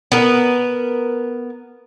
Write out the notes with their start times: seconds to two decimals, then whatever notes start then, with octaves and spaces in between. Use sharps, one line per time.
0.12 B3 A#4